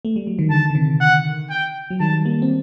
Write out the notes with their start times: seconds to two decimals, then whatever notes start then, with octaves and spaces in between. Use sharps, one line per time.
0.05 A3
0.16 G3
0.27 F#3
0.39 D#3
0.50 D3 A5
0.70 D3
0.75 C3 D#3
1.01 F#5
1.50 G5
1.90 F#3
2.00 D#3 G3 A5
2.25 G3 A#3
2.42 C4